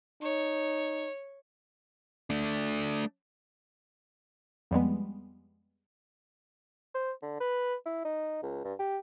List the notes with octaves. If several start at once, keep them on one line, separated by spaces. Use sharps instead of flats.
D#4 C#5
A3 D4
F2 G3 G#3 B3
C5
D3
B4
E4
D#4
C#2
G2
G4